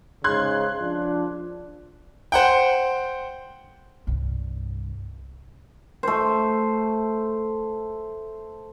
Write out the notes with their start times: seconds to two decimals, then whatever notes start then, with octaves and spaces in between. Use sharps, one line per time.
0.24 G#2 C#3 C6 F#6 G#6
0.80 F3 D4
2.32 C5 F#5 G5
4.07 C2 G2
6.03 A3 C5